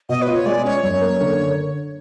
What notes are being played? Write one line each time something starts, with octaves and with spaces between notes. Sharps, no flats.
B2 D#5
B4
F4
C#5
G#3 D5
C#4 C#5
F#2 C#5
A#3
D3